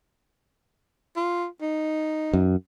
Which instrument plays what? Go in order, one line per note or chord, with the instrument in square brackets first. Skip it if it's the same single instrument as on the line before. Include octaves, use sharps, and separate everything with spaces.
[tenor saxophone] F4
D#4
[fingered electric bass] F#2